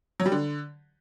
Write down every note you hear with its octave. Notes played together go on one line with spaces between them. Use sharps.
F#3
G3
D3